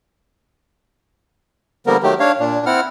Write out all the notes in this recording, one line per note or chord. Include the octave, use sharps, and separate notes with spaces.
D3 F3 G3 A#3 B3 A#4
D#3 F#3 A3 G4
D4 C#5 F5
A#2 D4
C4 E4 F#5 F6